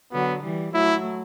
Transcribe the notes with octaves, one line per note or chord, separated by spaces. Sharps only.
D3 F#3 B3
E3 G3
F#3 A3 E4